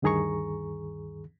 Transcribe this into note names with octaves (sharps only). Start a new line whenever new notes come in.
D2 G2 D#3 G#4 A#5 C#6